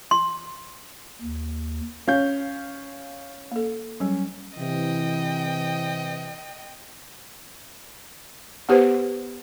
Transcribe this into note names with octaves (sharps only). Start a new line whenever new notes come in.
C6
D#2
C#4 F5 G6
A#3 A4
F#3 G3 C#4
C3 E3 D#5 G5
B3 G4 B4 C5